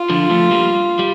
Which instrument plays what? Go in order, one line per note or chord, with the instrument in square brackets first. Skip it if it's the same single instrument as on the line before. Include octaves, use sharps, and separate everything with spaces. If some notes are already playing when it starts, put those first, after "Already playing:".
Already playing: [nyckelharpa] F4
[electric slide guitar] D3 F3
F3 A3
G3 A#3
G3